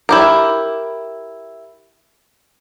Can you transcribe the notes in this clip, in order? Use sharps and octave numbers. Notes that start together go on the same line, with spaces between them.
E4 G4 A#4